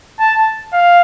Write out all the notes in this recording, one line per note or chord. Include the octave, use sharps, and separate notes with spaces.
A5
F5